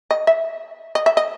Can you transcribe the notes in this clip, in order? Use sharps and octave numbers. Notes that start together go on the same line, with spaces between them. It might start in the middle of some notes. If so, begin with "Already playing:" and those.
D#5
E5
D#5
E5
D#5